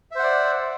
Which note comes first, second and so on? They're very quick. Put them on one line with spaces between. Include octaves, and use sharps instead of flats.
E5 C5 F#5 D5